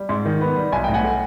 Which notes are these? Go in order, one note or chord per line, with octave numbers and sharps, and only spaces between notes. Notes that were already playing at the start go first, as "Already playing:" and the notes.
Already playing: G3
G#2
D#3
B3
G3
B1 G#5
A2 G5
F#5 G#5
A3